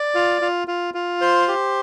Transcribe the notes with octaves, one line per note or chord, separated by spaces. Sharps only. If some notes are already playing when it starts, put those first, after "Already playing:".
Already playing: D5
F4
F4
F4
F4
C5
G4